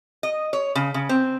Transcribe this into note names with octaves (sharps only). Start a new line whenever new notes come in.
D#5
C#5
C#3
C#3
C4